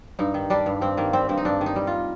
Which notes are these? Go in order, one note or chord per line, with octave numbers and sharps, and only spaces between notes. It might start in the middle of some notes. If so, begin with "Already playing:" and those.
G2 D#4
D#3
G3 D4
G2
G2 C4
D#3 A#3
G3 C4
G2 C4
D#4
G2 D4
D#3
D#4
G3
F4